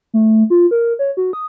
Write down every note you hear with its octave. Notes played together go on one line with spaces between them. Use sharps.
A3
F4
A#4
C#5
F#4
D#6